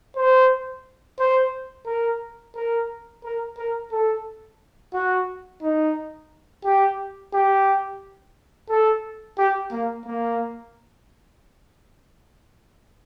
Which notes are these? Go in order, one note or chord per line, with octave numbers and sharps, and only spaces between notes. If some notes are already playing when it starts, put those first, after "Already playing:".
C5
C5
A#4
A#4
A#4
A#4
A4
F#4
D#4
G4
G4
A4
G4
A#3
A#3